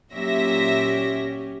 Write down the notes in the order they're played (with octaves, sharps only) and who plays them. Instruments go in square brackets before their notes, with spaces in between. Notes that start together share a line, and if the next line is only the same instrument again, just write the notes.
[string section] A#2 E5 A#6 [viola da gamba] F#3 C#4 G4